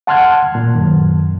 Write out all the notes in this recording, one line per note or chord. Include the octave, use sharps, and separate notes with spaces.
F#5 A5 C6 F6 F#6 G#6
A#2
F#2 D#3